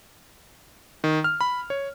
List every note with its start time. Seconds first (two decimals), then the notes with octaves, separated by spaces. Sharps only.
1.04 D#3
1.24 F6
1.41 B5
1.70 C#5